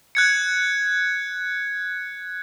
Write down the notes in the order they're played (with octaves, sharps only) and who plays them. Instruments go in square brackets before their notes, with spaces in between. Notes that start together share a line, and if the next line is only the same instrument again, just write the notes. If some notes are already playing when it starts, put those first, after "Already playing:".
[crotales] F#6 G#6 C#7